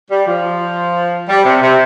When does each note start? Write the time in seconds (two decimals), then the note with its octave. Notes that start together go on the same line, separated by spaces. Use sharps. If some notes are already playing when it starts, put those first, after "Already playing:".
0.11 G3
0.27 F3
1.29 G3
1.45 C3
1.62 C3